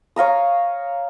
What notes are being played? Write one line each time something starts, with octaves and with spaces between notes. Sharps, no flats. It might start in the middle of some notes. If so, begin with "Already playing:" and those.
C#5 F5 A#5 D#6